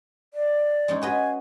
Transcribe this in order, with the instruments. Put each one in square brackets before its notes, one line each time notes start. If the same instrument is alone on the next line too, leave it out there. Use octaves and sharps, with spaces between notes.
[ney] D5
[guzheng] G#3 C#4 D#4
[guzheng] F#4 B4 D#5 [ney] G#5